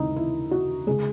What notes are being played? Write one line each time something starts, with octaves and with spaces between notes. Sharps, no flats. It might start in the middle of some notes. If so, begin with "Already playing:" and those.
Already playing: D#2 C#3 G#3 D#4 E4
E4
F#4
C#3 G#3 G#4